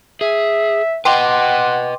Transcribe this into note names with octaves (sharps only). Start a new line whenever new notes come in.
G#4 E5
B4 D#5 F#5 G5 C6 D6